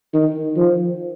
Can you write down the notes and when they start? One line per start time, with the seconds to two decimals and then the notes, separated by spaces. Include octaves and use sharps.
0.13 D#3
0.57 F3